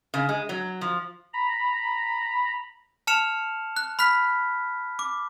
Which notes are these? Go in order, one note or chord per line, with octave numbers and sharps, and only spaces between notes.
C#3
G#3
F#3
F3
A#5 B5
A5 F6 C#7 E7 F7
F#6
B5 F6 F#6 B6
D6